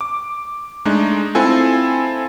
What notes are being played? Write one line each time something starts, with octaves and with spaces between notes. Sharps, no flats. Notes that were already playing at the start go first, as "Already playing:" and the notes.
D6
G#3 A3 D4 D#4
C4 E4 F4 A4 G#5